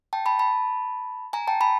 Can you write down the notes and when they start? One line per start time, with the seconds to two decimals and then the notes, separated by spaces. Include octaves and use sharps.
0.13 G5 A5
0.26 A5 B5
0.39 A5 B5
1.33 G#5 A#5
1.48 G5 A5
1.61 A5 B5